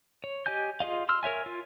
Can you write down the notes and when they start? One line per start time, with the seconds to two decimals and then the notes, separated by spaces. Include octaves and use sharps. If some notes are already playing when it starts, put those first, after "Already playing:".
0.24 C#5
0.46 G4 D#5 G#5 G6
0.80 F4 G#4 D#5 F5
1.09 C6 E6 F6
1.23 A#4 C#5 E5 G#5
1.46 F4